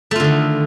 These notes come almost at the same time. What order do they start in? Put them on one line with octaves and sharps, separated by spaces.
A3 F4 D3 D#3